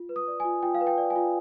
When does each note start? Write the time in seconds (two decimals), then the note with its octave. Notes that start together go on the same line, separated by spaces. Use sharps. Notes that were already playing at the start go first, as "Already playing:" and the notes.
Already playing: F4
0.09 B4
0.16 D#6
0.28 D5
0.40 G#5
0.45 F4
0.63 F4 G5
0.74 F5
0.81 B4
0.87 G5
0.98 D5
1.10 G#5
1.16 F4